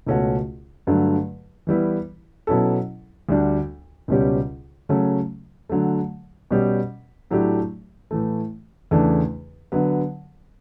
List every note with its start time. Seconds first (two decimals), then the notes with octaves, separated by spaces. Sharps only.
0.07 C#2 B2 A3 C#4 F#4
0.87 G2 D3 F#3 A3
1.67 E3 G3 B3 E4
2.47 B2 F#3 C#4 E4 A4
3.29 D2 D3 G3 D4 F#4
4.08 C#2 B2 G3 C#4 G4
4.89 C#3 F#3 A3 C#4
5.70 D3 F#3 A3
6.51 B2 G3 C#4 G4
7.31 A2 F#3 A3 D4 G4
8.11 A2 E3 A3
8.91 E2 C#3 E3 A3 D4
9.72 D3 F#3 B3